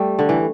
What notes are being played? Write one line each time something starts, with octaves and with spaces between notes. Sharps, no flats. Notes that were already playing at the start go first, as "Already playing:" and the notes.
Already playing: G3 A3
D3
E3